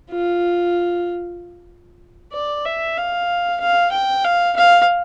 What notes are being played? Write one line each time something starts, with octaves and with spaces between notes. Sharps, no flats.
F4
D5
E5
F5
F5
G5
F5
F5